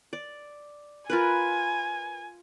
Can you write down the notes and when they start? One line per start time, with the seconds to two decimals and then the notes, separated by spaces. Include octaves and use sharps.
0.13 D5
1.10 F4 A#4 B4 G#5